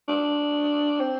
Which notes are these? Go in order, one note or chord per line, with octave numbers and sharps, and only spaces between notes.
D4
C4